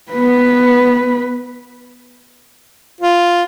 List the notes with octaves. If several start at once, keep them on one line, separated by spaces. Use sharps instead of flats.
B3 B4
F4